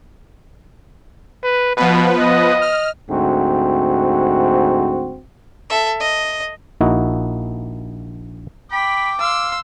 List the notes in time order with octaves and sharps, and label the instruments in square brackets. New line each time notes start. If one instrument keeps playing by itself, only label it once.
[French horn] B4
[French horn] B2 [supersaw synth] F3 B3 B4
[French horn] D#5
[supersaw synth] F6
[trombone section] D2 G#2 C4 F#4
[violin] A4 E5
D#5
[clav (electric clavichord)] A#1 A#3 D#4 E4 F#4
[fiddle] G5 [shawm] B5 [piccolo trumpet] D6
[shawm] F5 [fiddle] C6 E6